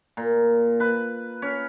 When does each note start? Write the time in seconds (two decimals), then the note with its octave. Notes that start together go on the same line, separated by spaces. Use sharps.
0.17 A#2
0.80 B4
1.42 C#4